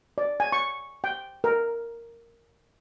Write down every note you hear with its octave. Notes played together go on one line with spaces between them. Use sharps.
D5
G#5
C#6
G5
A#4